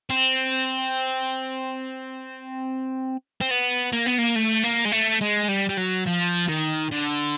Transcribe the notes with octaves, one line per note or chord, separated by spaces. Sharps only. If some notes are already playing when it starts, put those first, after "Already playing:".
C4
C4
B3
A#3
B3
A#3
A3
A#3
G#3
A3
G#3
G3
G3
F#3
F3
D#3
D3